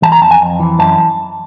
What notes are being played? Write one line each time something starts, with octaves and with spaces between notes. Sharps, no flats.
E3 A5
A#5
F2 A5
G#5
F2
E3
F#2 A5